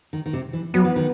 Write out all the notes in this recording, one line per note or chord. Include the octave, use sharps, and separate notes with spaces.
D#3
D#3
C3
E3
F#3 B3
E3
D#3